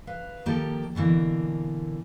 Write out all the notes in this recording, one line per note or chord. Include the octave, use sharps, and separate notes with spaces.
B4 E5 F5
D#3 F3 A#3 G4 A4
B2 D3 E3 A#3